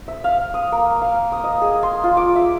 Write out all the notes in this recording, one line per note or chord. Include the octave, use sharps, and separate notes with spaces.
E5
F5
D#6
A#3
F5
D#6
D#5
G#4
C6
F4
D6
E5